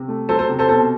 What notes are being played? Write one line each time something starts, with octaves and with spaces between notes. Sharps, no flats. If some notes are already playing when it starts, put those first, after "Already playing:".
Already playing: C3
A3
F#3 A4 C5
A4 C5
C3
A4 C5
B2 A4 C5